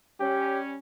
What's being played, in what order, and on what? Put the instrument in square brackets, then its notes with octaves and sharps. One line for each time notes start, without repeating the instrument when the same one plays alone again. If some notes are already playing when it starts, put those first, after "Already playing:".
[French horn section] G3 C#4 [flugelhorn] G4